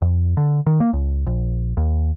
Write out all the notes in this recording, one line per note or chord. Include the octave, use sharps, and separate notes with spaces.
F2
D3
D#3
A#3
C#2
A#1
D#2